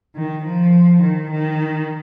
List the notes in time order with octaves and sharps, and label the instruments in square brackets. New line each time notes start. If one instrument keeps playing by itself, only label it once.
[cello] D#3
F3
D#3
D#3